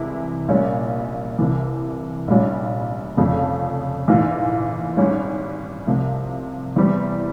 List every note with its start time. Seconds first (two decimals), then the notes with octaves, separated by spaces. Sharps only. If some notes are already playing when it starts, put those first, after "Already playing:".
Already playing: C2 C3 E3 G#3 E4
0.48 A#1 A#2 G3 C#4
1.39 C2 C3 E3
2.28 A#1 G#2 G3 C#4 F4
3.17 F1 F2 C#3 F3
4.08 A#1 G#2 E3 A#3 F4
4.97 G#1 G#2 G3 C#4
5.87 C2 C3 F3
6.76 E2 E3 G3 C4